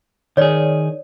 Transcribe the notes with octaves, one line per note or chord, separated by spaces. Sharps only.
D#3 G#4 C#5 D5